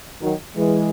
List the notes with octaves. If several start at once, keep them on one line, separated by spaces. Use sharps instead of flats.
D#3 F#3
E3 G#3